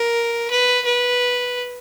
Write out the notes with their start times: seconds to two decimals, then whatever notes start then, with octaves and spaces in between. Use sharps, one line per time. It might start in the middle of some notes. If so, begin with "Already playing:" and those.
Already playing: A#4
0.51 B4
0.85 B4